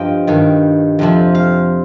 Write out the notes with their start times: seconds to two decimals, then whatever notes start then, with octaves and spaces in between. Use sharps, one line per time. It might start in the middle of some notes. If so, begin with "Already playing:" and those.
Already playing: G2 F3 F4 G4 D#5 G5
0.27 G2 D#3
0.99 F2 C3 F3
1.35 F5